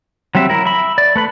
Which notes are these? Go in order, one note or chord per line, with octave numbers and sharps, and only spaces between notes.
F#3 G3 C4 E5
E4 A#4
E5 B5
D5
A3 B4 B5